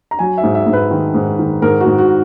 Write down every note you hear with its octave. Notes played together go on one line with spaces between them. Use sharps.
A#5
F#3 G#5
E5
G#2
E5
G#2
B4
D#3
G#2
D#3
G#2 A#4
F#4
G#2
F#4